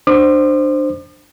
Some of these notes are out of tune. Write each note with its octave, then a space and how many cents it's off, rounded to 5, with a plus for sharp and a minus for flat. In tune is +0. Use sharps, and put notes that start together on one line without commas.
D4 +20 C5 +0 D6 +45